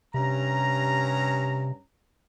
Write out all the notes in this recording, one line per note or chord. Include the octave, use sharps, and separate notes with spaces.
G2 C3 C#4 A#5